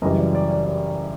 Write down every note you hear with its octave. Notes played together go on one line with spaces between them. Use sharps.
F#2 C#3 E3 G3 D#5
D5
D5
D5
D5